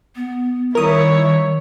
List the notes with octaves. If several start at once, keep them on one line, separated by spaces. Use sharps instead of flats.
B3
D#3 G3 E4 A#4 C#5 D#6